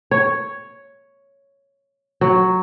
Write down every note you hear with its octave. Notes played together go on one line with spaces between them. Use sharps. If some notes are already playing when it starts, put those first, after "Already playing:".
C#5
F#3